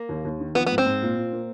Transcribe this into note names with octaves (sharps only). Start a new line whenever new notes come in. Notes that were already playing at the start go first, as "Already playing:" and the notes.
Already playing: A#3
D#2
D#2
D#3
F3 B3
G#2 B3
C4
G#2
A#2
A#2
A#3